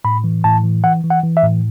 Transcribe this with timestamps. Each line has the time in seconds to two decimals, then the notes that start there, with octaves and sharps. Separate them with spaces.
0.05 A2 B5
0.24 E3
0.44 A2 A5
0.64 E3
0.84 E3 F#5
1.04 E3
1.10 F#5
1.23 E3
1.37 E5
1.43 A2